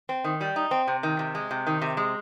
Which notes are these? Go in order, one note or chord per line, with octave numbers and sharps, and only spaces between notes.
C4
D#3
G3
D#4
C4
C3
D#3
C3
G#3
C3
D#3
C3
G#3